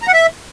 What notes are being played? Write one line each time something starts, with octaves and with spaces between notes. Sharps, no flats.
A#5
F#5
E5